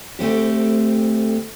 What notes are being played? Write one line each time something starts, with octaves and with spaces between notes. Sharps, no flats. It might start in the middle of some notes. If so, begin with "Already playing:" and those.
D2 A3 C4 G4